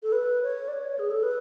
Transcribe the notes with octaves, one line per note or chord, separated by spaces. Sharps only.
A4
B4
C#5
D5
C#5
G#4
A4
B4